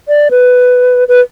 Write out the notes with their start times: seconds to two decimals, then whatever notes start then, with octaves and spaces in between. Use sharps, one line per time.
0.08 D5
0.31 B4
1.08 B4